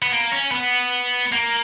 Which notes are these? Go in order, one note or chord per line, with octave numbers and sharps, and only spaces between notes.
B3
A#3
C#4
B3
A#3